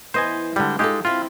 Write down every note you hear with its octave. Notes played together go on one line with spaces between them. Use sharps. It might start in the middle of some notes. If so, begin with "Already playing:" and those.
E3 B3 C5 D#5 G#5
D3 G3 G#3
G#3 D#4 F4 G4 A4
C4 E4 F4 G5